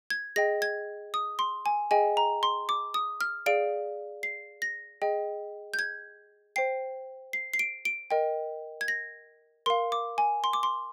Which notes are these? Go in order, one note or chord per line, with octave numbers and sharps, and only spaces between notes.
G#6
G#4 D#5 G5 A#6
G#6
D#6
C6
G#5
G#4 D#5 G5 G#5
A#5
C6
D6
D#6
F6
G#4 D5 F5 D7
C7
A#6
G#4 D#5 G5
G6
G#6
C5 G5 C7
C7
C7
D7
D7
A#4 D#5 G5
G#6
A#6
A#4 F5 C6
D6
G#5
C6
D6
C6